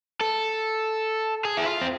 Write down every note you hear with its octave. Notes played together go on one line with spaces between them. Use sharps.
A4
G#4
E4
F4
C4